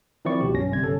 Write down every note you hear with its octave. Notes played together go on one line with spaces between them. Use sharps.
D#3 F3 C4 E4 D5 C#6
C2 B2 G4
B1 G2 C#4 A#6
G1 C3 G3 G#6
G1 C#4 A4